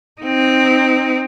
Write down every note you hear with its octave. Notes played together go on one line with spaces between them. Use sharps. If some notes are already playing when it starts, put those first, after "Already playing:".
C4 D#4